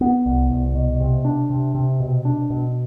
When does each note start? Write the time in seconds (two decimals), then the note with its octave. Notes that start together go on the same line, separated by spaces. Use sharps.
0.01 B3
0.26 C2
0.50 C2
0.75 B2
1.00 C3
1.25 D4
1.50 C3
1.75 C3
2.00 B2
2.25 D4
2.50 B2